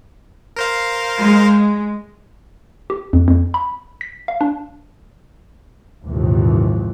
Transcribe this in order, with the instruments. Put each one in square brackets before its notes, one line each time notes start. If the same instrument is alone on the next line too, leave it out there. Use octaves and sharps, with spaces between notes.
[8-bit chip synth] A#4 C5 F5
[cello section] G#3
[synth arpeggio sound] G4
F2
F2
B5
B6
F5
D4
[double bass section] A#1 D#2 G#2 C3 E3 F3